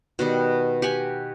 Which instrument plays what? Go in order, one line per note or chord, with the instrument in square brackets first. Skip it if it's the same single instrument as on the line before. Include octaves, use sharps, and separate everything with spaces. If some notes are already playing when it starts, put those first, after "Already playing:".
[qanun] B2 D#3 G3
G4 F#5 G#5